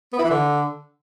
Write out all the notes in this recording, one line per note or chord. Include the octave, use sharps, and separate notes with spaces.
B3
E4
E3
D3